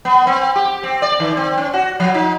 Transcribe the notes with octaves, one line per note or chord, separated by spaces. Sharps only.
B3
C4
G4
C4
D5
D#3
C4
C#4
F#4
F3
D#4